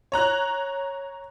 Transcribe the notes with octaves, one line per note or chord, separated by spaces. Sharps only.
C#5 A#5 F#6